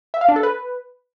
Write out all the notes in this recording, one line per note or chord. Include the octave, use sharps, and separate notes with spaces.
E5
F5
D4
A4
B4